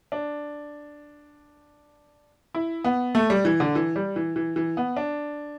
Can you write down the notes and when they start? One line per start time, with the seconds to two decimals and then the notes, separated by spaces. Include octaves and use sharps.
0.12 D4
2.55 E4
2.84 B3
3.15 A3
3.30 G3
3.45 E3
3.60 D3
3.75 E3
3.96 G3
4.16 E3
4.36 E3
4.56 E3
4.77 B3
4.97 D4